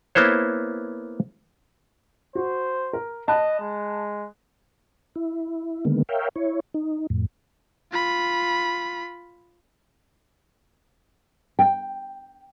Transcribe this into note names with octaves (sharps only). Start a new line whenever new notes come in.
A#3 B3 E4 C5 C#5
F#4 C5
A#4
D#5 A5 B5 F#6
G#3
E4
D3 D#3 G#3 A#3 B3
A#4 C#5 E5 F5 G5
E4 C#5
D#4
F2 A2
F4 B5
G5